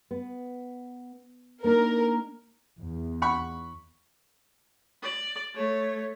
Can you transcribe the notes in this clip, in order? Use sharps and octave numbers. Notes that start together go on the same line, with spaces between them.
B3
A#3 D4 D#4 A#4
E2
F#5 B5 C#6
D5
A3 C#5